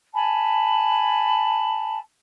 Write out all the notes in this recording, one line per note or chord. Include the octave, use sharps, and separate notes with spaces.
G#5 A5 B5